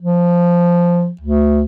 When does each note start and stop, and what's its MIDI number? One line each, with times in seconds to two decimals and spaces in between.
0.02 1.10 53
1.21 1.63 38